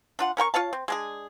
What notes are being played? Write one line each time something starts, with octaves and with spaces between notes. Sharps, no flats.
D4 F4 F#5
C#4 A#4 G5 C#6
F4 C#5 F5 A5
C4
G#3 D4 G#4